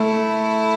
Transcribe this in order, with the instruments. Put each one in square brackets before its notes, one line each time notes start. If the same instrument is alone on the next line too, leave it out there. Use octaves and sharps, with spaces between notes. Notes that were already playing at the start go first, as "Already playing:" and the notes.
Already playing: [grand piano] A3 [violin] E4